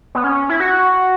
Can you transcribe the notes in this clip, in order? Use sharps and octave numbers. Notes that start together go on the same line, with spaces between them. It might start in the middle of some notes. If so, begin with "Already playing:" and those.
B3
C#4
E4
F#4